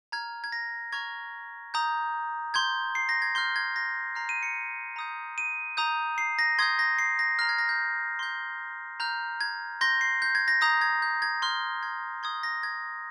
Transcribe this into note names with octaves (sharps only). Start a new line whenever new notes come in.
A#5 F6 G#6
G#6
A#6
A#5 C#6 F6 G#6
A#5 D#6 G6
C6 G6 G#6
C7
A#6
G#6
C6 F6 G6
G#6
A#6
A#5 F6 C7
D#7
C#7
A#5 D#6 G6
D#7
A#5 D#6 G6
C7
A#6
C6 D#6 G6 G#6
A#6
C7
A#6
A#5 F6 A#6
G#6
A#6
G6
C6 G6
A#5 F6 G6
G#6
C6 G6 A#6
C7
G6
G#6
A#6
A#5 D#6 G6 A#6
G#6
G6
G#6
C6 F6
G#6
C6 D#6 G6 G#6
A#6
G#6